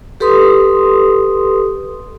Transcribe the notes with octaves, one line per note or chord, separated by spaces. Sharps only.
G4 A4 B4 C6 D#6